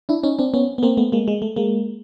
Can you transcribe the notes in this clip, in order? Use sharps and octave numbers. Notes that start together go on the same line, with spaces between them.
D4 E4
C#4 D#4
C4 D4
B3 C#4
B3
A#3 C4
A3 B3
G#3 A#3
G#3
A3
G#3 A#3